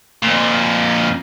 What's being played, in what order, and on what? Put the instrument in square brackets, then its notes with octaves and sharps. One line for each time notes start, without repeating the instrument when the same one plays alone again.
[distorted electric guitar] F2 A#2